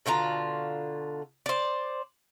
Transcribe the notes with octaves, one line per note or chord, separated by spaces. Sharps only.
B2 D3 F4 A#5
C5 D5